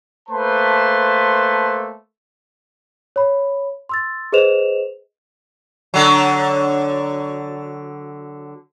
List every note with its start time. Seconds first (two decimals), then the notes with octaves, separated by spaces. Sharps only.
0.28 A3 A#3 B4 C5 A5 C6
3.16 C#5 B5
3.89 C6 E6 A6
4.32 G#4 B4 C5 D#5 E7 F7
5.94 D3 F#3